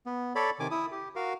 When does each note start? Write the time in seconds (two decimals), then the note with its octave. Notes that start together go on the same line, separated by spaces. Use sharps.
0.06 B3
0.35 A4 C#5 D5 B5
0.60 C3 D#3 G#5 D6
0.71 E4 D#6
0.92 G4
1.16 F#4 A#4 F5